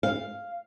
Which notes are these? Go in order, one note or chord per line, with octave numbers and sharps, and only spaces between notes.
F5